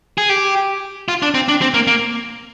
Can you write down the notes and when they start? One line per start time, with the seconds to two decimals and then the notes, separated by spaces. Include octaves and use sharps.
0.18 G#4
0.29 G4
1.08 F4
1.22 D4
1.34 C4
1.49 D4
1.62 C4
1.74 A#3
1.87 A#3